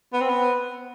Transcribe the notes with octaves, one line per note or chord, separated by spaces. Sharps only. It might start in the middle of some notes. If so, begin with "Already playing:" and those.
B3
C4
B3